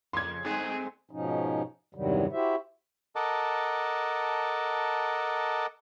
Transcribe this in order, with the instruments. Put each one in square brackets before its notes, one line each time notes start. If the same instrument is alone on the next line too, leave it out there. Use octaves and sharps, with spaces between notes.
[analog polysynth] F2 C#3 [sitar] A#3 [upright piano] C6 G#6
[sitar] G2 G#3 A3 [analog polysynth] C4 [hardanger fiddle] G#4
[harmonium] G#2 B2 F3 C#4 D#4
E2 G2 C3 D#3 F#3 G3
E4 F#4 G4 C5 E5
[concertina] A4 A#4 D#5 F#5 A5 D6